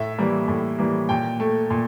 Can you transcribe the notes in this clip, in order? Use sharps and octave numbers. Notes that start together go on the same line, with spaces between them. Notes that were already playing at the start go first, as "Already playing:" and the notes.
Already playing: A2 E5
E3 G3 A#3
A2
E3 G3 A#3
A#2 G5
A3
A#2